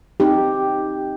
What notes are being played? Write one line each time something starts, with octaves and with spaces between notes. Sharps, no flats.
C4 D#4 G4